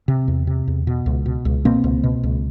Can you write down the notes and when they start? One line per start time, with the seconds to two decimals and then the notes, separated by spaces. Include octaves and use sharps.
0.08 C3
0.28 E2
0.47 C3
0.67 E2
0.87 B2
1.06 C#2
1.26 B2
1.45 C#2
1.65 B2 A#3 C4
1.84 C#2
2.03 B2
2.23 C#2